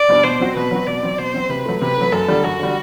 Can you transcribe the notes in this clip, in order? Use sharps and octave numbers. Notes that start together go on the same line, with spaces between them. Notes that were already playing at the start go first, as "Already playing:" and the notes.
Already playing: D5
B2 G3 D4
B2 C5
F#3 C4 F#4
B2 B4
F#3 C4 F#4
B2 D5
F#3 C4
B2 C5
F#3 C4
C3 B4
F#3 A3
C3 B4
F#3 A3
F#2 A4
D3 G3
F#2 F#4
D3 G3